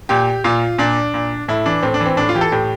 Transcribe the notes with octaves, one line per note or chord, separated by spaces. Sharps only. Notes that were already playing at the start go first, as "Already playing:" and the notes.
A#2 G4
A#2 F4
A#2 D4
A#2
A2 E4
E3 D4
A2 C4
D4
E3
C4
A2 D4
F4
E3 G4
A4
A2 G4